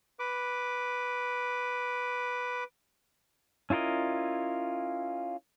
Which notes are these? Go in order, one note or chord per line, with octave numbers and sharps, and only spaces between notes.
B4 D6
C#4 E4 F4 A#4 D#5